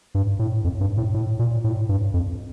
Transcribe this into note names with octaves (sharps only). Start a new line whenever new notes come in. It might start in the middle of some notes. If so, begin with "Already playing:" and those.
G2
A2
F2
G2
A2
A2
A#2
A2
G2
F2